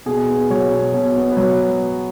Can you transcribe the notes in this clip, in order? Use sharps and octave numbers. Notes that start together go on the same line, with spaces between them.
B2 G#4
B3
F#3 C#5
B2
B2 C#5
B3
B4
F#3 C#5